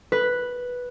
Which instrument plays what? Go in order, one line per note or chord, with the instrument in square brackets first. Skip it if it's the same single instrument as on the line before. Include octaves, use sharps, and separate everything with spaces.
[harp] B4